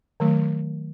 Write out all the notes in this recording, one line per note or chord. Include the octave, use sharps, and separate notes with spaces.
D#3 F#3 A3